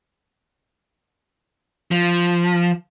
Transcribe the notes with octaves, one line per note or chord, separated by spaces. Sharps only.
F3